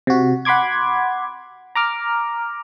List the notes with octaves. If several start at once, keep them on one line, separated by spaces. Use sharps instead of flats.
C3 F#4
F#5 B5 C6 D6 G#6
A#5 D6 F6